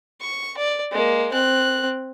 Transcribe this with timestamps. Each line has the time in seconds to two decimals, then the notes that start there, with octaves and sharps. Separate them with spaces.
0.21 C#6
0.57 D5
0.91 G#3 A#3
1.33 C4 F#6